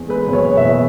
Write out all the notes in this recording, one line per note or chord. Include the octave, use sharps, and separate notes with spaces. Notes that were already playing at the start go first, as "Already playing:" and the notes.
Already playing: E2
G#3 B4
F#1
C#5
B2
E5
E2